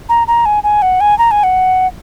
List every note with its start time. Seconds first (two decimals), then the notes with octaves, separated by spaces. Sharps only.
0.09 A#5
0.27 A#5
0.45 G#5
0.64 G#5
0.82 F#5
1.00 G#5
1.18 A#5
1.31 G#5
1.43 F#5